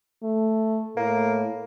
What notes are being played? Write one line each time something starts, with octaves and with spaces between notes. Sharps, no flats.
A3
A2 A#3